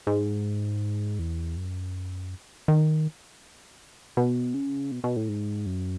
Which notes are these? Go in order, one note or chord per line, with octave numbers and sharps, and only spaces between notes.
G#2
E2
F#2
D#3
B2
C#3
B2
B2
A2
G#2
F#2